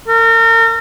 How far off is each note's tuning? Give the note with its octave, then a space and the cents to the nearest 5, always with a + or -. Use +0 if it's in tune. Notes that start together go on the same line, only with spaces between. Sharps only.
A#4 -35